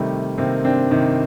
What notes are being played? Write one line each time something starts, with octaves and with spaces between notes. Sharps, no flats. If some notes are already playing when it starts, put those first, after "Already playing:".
Already playing: C3 D#3 G3 A3
C3 D#3 A#3 C4
C4 D4
C3 D#3